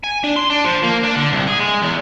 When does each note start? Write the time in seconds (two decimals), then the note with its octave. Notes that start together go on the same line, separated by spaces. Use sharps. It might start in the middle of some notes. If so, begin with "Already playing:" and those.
0.04 G#5
0.24 D4
0.36 C6
0.50 D4
0.65 F3
0.84 A#3
1.05 D4
1.17 D3
1.33 C2
1.48 G#4
1.60 G#3
1.82 E2